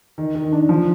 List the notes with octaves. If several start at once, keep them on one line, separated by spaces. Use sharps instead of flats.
D#3
D#3
D4
F3